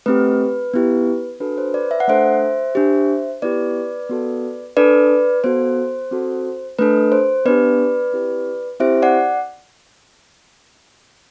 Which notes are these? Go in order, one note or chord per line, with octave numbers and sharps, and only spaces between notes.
A3 C4 G4 B4
B3 E4 G4
D4 F#4 A4 B4
C5
B4 D5
E5
F#5
A3 D4 A4 C5 E5
D4 G4
B3 E4 G4 B4 D5
B3 F#4 A4
D4 A4 B4 D5
B3 F#4 A4 C5
C4 F#4 A4
A3 D4 A4 B4
C5
B3 D4 G4 B4 D5
C4 E4 G4
C4 E4 G4 C5 E5
D5 F#5